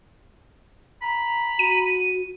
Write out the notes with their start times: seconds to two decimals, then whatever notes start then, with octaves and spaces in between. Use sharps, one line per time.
1.02 A#5 B5
1.59 F#4 D#7